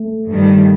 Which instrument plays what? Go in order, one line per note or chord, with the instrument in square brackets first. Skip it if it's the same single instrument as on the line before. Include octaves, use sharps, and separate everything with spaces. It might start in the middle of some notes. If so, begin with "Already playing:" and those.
Already playing: [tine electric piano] A3
[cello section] G2 D#3 G3